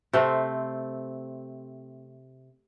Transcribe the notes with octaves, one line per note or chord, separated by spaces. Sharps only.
C3 A3 C4